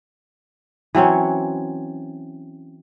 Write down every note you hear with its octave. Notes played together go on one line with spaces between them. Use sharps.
E3 F#3 C4 C#4